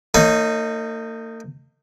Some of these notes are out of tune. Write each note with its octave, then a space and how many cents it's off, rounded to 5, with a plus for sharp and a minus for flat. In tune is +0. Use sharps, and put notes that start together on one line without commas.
A#3 -45 D#4 -5 C#5 +0